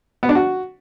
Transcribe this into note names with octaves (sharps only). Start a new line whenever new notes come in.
B3
D4
F#4